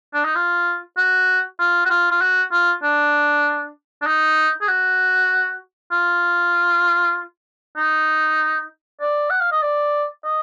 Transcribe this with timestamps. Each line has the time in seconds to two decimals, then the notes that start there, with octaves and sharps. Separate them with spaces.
0.14 D4
0.25 D#4
0.35 F4
0.97 F#4
1.59 F4
1.85 F#4
1.90 F4
2.11 F4
2.21 F#4
2.52 F4
2.83 D4
4.02 D4
4.06 D#4
4.61 G#4
4.68 F#4
5.92 F4
7.77 D#4
9.01 D5
9.30 F#5
9.40 F5
9.52 D#5
9.62 D5
10.24 D#5